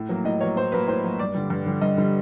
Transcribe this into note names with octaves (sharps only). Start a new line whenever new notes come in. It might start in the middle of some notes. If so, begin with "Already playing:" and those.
Already playing: A2
F#3 A#3
A2 D#5
F#3 A#3 C#5
A2 C5
F#3 A#3 B4
A2 C5
F#3 A#3
G2 D5
D3 G3
G2
D3 G3
G2 D#5
D3 G3